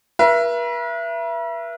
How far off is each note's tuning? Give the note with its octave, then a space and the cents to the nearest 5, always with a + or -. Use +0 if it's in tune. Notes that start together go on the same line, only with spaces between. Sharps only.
B4 -45 E5 +30